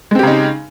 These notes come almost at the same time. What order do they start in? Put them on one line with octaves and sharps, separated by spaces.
G#3 C4 G4 C#3 D#4